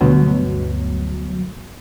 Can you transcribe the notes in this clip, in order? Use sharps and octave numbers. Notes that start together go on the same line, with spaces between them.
D2 G2 B2 F#3